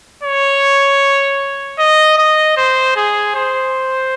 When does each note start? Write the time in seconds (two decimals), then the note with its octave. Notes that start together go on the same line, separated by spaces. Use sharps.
0.23 C#5
1.79 D#5
2.18 D#5
2.57 C5
2.96 G#4
3.35 C5